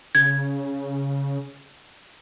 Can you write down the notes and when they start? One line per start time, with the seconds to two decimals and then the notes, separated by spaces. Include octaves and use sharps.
0.15 C#3 G#6